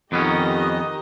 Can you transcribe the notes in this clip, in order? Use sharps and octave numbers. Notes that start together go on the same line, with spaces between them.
F2 D#3 B3 C#4 G4 D#5